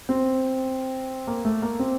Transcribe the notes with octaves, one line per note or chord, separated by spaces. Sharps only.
C4
A#3
A3
A#3
C4